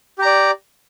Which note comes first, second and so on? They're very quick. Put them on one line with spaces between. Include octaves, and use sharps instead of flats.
G4 A#5 D5